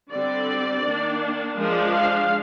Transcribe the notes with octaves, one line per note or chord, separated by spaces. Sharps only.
D3 G3 C4 D5
D#3 A#3 D4
F3 G#3 D4 A#4
F5